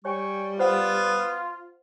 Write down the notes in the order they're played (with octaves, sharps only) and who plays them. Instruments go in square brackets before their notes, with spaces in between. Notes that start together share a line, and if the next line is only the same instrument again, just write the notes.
[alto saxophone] G3 [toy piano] C#5 [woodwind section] G5 G#5 C#6
[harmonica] B3 [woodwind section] F4 [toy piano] C5 F#5